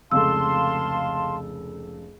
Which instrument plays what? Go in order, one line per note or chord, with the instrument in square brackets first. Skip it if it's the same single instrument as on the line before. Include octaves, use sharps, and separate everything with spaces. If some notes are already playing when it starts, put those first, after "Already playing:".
[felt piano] F1 C#2 A4 [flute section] F5 A5 C6 [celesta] E6